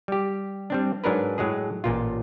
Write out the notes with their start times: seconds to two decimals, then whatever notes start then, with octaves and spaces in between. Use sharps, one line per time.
0.08 G3 G4
0.70 G3 C4 D4
1.04 G#2 F#3 D4 A#4 B4
1.38 A2 F#3 G#3 G#4
1.84 A1 A#2 F4